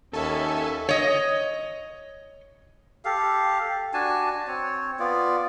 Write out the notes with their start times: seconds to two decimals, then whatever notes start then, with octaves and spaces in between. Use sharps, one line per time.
0.13 D#2 C#4 A4 E5 G#5 A5
0.89 C#5 D#5
3.05 G4 A4 F5
3.94 D4 F#4 G#5 A5
4.47 C4 C#5
4.99 B3 F4 D5